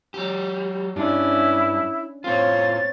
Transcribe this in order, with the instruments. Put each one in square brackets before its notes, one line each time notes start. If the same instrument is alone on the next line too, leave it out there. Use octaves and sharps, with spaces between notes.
[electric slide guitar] F#3 G4
[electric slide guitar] G2 [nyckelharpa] C#4 D4 [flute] E4
[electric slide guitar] A2 F4 [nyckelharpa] C4 C#5 [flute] A6